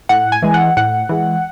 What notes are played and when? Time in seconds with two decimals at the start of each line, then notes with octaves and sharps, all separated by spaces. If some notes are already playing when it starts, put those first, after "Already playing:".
0.09 A2 F#5
0.32 G#5
0.42 E3 G#3
0.54 F#5
0.77 A2 F#5
1.09 E3 G#3